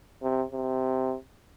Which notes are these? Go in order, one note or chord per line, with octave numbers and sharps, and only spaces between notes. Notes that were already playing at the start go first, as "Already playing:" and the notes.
C3
C3